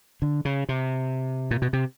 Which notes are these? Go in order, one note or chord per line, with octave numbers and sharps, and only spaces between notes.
D3
C#3
C3
A#2
B2
C3